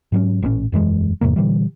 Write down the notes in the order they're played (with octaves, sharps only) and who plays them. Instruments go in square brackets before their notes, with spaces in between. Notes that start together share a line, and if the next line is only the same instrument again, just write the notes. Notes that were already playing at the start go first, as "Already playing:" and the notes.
[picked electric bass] G#2 F#3 C#4
A1 G2 A#2 C#4
E1 F#2 E3 G#3
E2 G#2 C3 A#3
A#2 D3 E3 G3